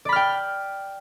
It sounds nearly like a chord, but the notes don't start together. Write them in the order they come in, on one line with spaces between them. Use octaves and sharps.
D5 B5 F6 G5